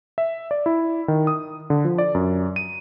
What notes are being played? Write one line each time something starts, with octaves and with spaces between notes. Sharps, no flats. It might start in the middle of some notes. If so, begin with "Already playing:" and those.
E5
D5
E4
D#3
D#6
D3
F3
D5
F#2
D#7